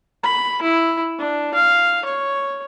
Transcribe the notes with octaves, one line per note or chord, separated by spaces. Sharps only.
B5
E4
D4
F5
C#5